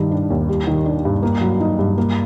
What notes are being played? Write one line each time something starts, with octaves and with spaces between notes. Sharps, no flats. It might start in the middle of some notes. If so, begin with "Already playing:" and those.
Already playing: G2 D#3 G3
D4
D#2
G3
D#3
D4
G2
A#3
F#3
D#4
G2
A#3